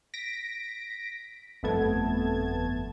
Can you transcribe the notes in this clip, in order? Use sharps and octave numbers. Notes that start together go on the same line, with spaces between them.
A#6 B6 D7
G1 F2 A3 B3 A5 G#6